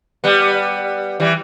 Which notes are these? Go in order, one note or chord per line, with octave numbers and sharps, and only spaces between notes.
G3 B3
E3 G3